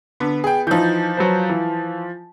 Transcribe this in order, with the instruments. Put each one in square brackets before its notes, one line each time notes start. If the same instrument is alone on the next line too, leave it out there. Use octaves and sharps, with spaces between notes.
[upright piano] D3 [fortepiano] B3
[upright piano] G#4 G5
[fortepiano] E3 D#4 [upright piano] F3 G6
[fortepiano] F#3 B4 C5
E3